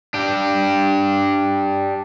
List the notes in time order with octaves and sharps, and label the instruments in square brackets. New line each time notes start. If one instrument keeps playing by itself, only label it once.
[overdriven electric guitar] D4 G4